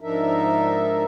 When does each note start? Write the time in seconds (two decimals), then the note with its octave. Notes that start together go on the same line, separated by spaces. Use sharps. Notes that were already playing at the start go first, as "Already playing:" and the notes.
0.01 G#2 F3 D4 D#4 A#4 E5